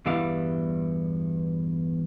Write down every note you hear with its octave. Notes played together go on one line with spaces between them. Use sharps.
E2 G2 G3 B3 E4 F5